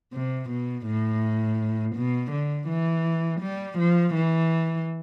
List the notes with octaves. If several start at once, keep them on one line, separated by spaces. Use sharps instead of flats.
C3
B2
A2
B2
D3
E3
G3
F3
E3